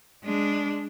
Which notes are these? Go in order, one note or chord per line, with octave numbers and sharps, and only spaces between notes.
G#3 D4